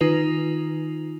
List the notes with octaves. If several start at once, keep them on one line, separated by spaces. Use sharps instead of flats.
D#3 D#4 F4 B4 F7